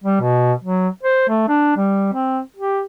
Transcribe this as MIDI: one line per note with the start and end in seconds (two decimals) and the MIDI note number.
0.04 0.20 55
0.21 0.53 47
0.64 0.88 54
1.03 1.27 72
1.29 1.46 57
1.48 1.76 62
1.77 2.13 55
2.14 2.41 60
2.57 2.82 67